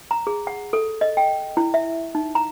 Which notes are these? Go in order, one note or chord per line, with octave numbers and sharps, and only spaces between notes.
A#5
G#4
F#5
A4
D#5
G5
E4
E5
D#4
A#5